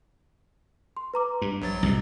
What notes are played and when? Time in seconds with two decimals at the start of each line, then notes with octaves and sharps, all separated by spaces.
0.97 C6
1.14 B4 A#5 D6
1.42 G2
1.61 A#1 F#3 A6
1.83 C2 G#2 B2